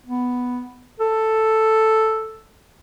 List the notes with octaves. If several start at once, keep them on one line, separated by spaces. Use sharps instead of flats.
B3
A4